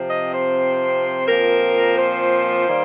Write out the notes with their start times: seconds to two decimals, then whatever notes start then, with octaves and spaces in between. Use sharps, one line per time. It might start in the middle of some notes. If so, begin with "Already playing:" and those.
Already playing: C3 F3 C4
0.09 D#5
0.33 C5
1.26 A#2 F3 C4 A#4
1.96 C5
2.67 D#3 G3 A#3